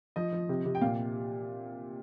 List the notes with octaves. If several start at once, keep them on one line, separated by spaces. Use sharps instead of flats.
F3 D#5
F3
C3
C3
G5
A#2 F5